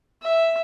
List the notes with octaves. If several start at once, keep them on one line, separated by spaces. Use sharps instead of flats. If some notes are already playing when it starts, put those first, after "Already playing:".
E5